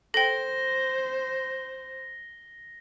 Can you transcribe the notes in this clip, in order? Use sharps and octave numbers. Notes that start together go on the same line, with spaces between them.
A4 C5 G5 A#6 G7